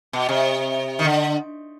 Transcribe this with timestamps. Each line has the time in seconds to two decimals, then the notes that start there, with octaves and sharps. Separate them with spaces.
0.13 B2
0.29 C3
0.99 D#3
1.05 D3